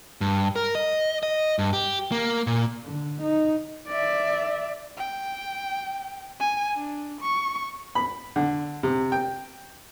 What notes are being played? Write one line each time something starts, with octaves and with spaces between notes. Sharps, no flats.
G2
A#4
D#5
D#5
G2
G4
A#3
A#2
D3
D#4
D5 E5
G5
G#5
D4
C#6
B5
D3
C3
G5